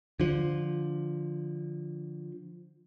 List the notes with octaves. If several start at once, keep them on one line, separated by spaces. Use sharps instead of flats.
D3 F3